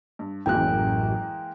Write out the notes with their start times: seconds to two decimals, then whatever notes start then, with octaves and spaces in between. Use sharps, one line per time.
0.19 G2
0.46 A1 F#2 E3 G#3 A#3 G5 F#6